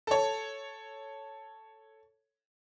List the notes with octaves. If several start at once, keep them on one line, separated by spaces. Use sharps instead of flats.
A4 C#5